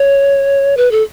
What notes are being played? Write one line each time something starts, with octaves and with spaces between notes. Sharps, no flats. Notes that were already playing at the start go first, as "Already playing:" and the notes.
Already playing: C#5
B4
A4